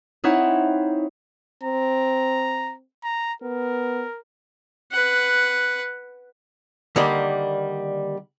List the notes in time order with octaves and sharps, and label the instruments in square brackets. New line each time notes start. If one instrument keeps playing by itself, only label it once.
[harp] C4 D#4 E4 C#5 F#5
[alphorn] C4 [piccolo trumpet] A#5
[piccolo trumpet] A#5
[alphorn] B3 [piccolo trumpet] A#4
[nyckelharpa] B4 F#5
[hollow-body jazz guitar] D3 D#3 G3 A#3 D5